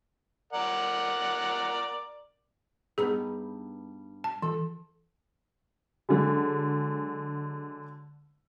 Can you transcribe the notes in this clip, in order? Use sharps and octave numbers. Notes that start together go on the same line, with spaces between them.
A#4 D5 F#5
G2 B3 D#4 G#4
A5
E3 A4
D3 F#3 G#3